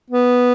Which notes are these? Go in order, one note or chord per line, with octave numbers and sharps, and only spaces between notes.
B3